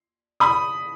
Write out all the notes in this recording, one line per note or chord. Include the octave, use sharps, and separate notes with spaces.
B5 D#6